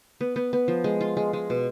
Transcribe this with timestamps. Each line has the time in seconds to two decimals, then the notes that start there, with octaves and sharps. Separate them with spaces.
0.21 B3
0.36 B3
0.53 B3
0.68 F3
0.84 G#3
1.01 F4
1.17 G#3
1.33 G#3
1.50 B2